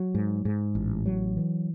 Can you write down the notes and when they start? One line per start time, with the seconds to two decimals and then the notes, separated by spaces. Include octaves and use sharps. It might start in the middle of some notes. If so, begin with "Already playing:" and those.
Already playing: F#3
0.15 G#2
0.45 G#2
0.75 A1
1.06 F#3
1.37 E3